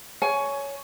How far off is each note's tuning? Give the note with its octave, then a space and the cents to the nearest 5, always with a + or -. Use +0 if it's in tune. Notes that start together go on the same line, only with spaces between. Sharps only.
C#5 +10 G#5 +20